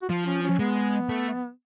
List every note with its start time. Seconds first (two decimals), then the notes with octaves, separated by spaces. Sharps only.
0.02 F#4
0.09 F3 F4
0.26 C#4
0.43 C#4
0.59 G#3 B3
1.09 A3